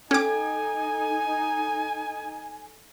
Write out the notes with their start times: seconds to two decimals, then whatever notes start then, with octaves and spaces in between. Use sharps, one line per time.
0.11 C#4 D#4 A4 G#5 D6